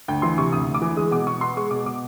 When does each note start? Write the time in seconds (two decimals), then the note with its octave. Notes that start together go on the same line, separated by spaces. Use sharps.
0.08 D2 G5
0.22 E3 C6
0.38 C3 C#6
0.52 D2 D#6
0.67 D2
0.75 D6
0.82 E3
0.96 G#3 D#6
1.11 B2 D6
1.27 B2 C#6
1.41 B3 C6
1.57 G#3 C#6
1.71 B2 D6
1.86 B2 D6